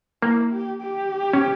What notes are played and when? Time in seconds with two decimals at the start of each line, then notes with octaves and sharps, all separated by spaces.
0.22 A#3 E4
0.52 G4
0.82 G4
1.33 C#4